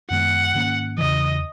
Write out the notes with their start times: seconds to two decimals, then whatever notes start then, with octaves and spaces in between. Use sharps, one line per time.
0.10 F#2 D#3 G#3 B3 F#5
0.54 G#2 D#3 A#3 C#4
0.98 E2 C#3 E3 D#5